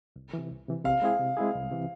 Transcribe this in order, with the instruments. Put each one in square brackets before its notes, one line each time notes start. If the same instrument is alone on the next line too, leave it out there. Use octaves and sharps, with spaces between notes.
[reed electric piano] C2
C3 E3
C2
C3 E3
[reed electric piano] C3 [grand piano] F5
[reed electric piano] G#3 C4 E4 G#4
C3
G#3 C4 E4 G#4
C2
C3 E3